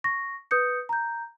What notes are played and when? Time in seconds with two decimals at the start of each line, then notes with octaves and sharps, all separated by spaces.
0.04 C#6 A#6
0.51 B4 D#6 G6 C#7
0.89 A#5 G6